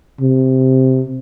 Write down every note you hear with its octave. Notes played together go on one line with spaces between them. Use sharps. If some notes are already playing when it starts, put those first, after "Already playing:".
C3